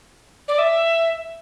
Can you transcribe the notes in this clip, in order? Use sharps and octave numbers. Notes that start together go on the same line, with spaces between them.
D5
E5